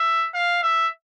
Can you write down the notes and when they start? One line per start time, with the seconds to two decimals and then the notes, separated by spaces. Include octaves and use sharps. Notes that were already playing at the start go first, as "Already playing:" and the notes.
Already playing: E5
0.34 F5
0.63 E5